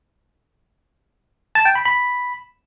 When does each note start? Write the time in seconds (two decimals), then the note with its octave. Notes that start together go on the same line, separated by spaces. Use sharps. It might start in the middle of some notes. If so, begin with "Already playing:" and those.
1.55 A5
1.65 G5
1.75 B5
1.85 B5